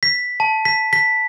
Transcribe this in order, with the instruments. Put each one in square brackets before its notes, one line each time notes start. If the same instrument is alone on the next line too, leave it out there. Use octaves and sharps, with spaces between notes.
[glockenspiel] B6
A5
B6
B6